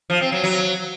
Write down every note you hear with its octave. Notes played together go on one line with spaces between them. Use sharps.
F3
C4
F#3
F#3